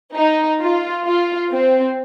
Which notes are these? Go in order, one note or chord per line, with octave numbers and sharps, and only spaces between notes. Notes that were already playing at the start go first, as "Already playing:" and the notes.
D#4
F4
F4
C4